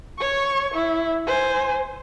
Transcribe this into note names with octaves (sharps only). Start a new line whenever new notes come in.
C#5 C#6
E4
C5 G#5